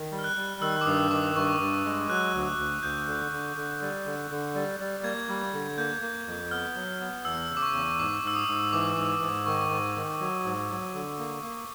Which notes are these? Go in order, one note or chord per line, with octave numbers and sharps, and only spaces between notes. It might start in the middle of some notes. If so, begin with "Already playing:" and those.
Already playing: D#3
G3
F6
F#6
G3
D#3 E6
D6
G2 D#6
D#3 D6
G2 C#6
G2
G#3
F#3 F#6
D2
D2
D2 G6
D3
D3
D3
G3
D3
D3
G3
G3
A#3 G#6
G3
D3
A#3 G6
A#3
F2
B3 F6
F#3
B3
E2 E6
C#3
D6
C#6
E2
G#2 D6
G#2 E6
D#6
G#2
E3 D6
G#2
G#2
D#3 C#6
G#2
D#3
F#3
G#2
F#3
D3
A#3
A#3